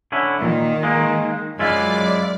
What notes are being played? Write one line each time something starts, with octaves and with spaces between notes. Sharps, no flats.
D3 C#4 E4
A#2 D#3
G#3 A#3
F#2 G#3 E4 F4 D5